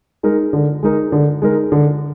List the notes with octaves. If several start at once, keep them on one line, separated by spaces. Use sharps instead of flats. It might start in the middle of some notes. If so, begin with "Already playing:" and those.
G#3 D#4 A#4
D3
G#3 D#4 A#4
D3
G#3 D#4 A#4
D3